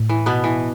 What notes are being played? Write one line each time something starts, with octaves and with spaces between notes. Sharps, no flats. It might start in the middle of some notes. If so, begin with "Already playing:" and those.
Already playing: A2
E3
B2 B3
E3